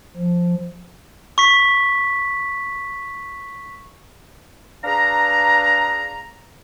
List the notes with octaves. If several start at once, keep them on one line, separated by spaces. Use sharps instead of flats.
F3
C#6 B6
D4 G#4 B4 F5 A#5